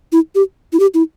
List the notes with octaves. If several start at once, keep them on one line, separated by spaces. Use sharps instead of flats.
E4
G4
E4
G4
E4